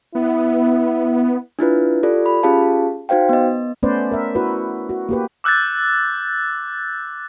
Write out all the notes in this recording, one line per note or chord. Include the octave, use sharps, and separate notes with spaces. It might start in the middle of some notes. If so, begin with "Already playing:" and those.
B3 E4
D4 E4 F4 B4
F4 G4 A4 D5
B5
C#4 F4 G4 G#4 F5 A5
D#4 F#4 C5 F5 G5
B3 D#5
A3 B3 C#4 B4 C5 D5
A#4 E5
E4 F#4 B4
F#4
A#3 G4 B4
D6 E6 F#6 G6 A6